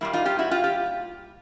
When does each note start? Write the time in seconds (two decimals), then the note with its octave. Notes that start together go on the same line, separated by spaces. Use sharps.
0.01 A#2 G3 A#3 E4
0.13 D#4 F4
0.26 F4 G4
0.39 E4 F#4
0.51 F4 G4
0.64 F4 G4